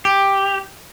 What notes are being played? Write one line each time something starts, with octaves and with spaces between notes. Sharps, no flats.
G4